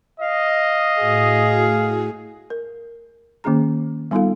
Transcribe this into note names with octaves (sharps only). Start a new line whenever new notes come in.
D#5 F5
A2 F#4 G#4
A#4
D#3 A#3 C#4 G#4 A#5
G3 B3 D#4 F4 A4 F5